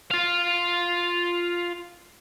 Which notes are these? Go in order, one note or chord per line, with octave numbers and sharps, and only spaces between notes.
F4 F5